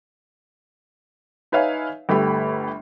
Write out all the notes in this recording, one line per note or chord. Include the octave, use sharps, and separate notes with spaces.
D#4 B4 C#5 E5 F5 G#5
G1 A3 G4 B5